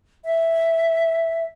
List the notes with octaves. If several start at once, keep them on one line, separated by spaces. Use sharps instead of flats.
E5